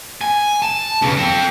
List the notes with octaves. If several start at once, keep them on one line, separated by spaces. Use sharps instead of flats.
G#5
A5
B1 C#3
C4 A4